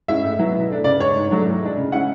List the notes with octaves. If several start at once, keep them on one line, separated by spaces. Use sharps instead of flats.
G#3 C#4 E4 E5
A2
F#3 B3 E4
B2
A3 D4
C#3 D5
G#3 D4 C#5
G#2
F#3 A3 D4
A2
G#3 D4
C#3
G#3 C#4 E4 F#5